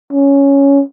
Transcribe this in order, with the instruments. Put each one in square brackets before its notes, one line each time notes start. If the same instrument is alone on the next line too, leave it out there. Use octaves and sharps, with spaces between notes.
[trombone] C#4